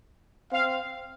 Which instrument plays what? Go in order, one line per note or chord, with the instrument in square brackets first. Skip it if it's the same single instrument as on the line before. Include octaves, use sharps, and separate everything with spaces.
[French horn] C4 [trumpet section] F5